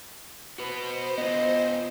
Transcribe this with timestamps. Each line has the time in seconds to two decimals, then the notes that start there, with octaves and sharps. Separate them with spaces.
0.58 F#4 B4 C5
1.18 B3 F4 D#5